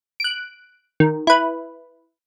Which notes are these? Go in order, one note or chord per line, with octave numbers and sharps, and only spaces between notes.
F#6 D7
D#3
E4 B4